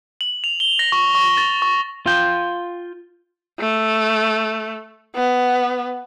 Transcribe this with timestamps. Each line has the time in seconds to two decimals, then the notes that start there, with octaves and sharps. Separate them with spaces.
0.21 F#7
0.44 F7
0.60 G7
0.79 A#6
0.92 C#6
1.15 C#6
1.37 A6
1.62 C#6
2.06 F4 G5
3.59 A3
5.15 B3